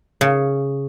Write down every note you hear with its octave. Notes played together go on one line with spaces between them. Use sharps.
C#3